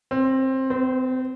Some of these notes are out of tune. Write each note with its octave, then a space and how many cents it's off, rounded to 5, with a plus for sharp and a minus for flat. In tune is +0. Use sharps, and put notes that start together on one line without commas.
C4 +15
C4 -30